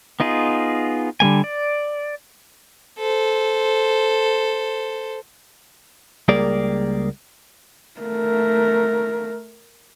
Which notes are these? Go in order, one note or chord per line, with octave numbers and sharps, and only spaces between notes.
B3 D#4 F4 G#4
D3 G3 A#3 G#5
D5
A4 C5
C#2 G3 A#3 G#4 A#4 D5
A3 A#4